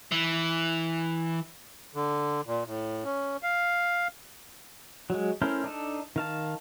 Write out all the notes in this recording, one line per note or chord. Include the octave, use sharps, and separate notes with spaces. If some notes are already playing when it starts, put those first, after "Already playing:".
E3
D3
A#2
A2
C#4
F5
F#3 G#3
A3 C#4 E4 A#4 C5
D4 D#4 A4
D#3 F5 A5